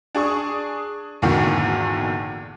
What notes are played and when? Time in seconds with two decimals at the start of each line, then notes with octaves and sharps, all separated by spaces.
0.15 D4 G#4 C#6 D#6
1.22 G#1 E2 A#2 D3 D#3 F#4